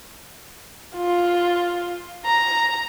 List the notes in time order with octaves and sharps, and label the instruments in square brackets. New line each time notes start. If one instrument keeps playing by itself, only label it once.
[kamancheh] F4
A#5